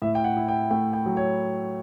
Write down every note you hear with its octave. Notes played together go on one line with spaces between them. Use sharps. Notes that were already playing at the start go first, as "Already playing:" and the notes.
A2 E5
G5
F#5
E4
G5
A3 G5
G5
F#3
C#5